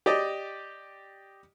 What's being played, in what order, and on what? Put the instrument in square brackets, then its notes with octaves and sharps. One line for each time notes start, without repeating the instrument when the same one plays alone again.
[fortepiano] G4 D5 D#5